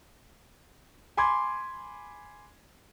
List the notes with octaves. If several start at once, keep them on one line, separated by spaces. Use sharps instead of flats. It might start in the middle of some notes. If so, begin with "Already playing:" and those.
G#5 B5 C6 D6 G#6